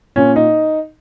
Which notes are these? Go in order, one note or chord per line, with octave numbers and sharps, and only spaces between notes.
A#2 C#4
D#4